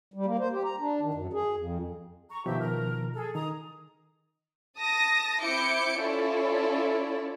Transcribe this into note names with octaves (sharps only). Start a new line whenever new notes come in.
G3
A#3
C5
G4
A#5
D4
D#3
F#2
G#4
F2
A#5 C#6
B2 D#3 F3 G4 E5
A#4
G#4 A4
D#3 A#5 D#6
A5 D#6 A#6
C4 E4 D6 G6 C#7 D7
C#4 E4 F4 A4 C#5 D5